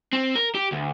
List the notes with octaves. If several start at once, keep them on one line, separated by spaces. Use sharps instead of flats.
C4
A#4
G4
D2